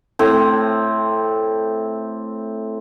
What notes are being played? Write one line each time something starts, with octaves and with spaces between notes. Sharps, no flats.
A2 C4